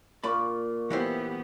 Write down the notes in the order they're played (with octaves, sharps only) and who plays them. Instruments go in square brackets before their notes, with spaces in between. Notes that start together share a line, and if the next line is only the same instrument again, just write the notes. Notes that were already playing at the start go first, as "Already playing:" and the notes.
[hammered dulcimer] A#2 F4 C#6 [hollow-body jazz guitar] D5 B5
[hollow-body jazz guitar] E3 E4 C5 [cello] B3 G4 [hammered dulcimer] F#5